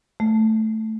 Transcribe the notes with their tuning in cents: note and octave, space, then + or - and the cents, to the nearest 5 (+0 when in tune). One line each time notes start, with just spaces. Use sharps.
A3 +0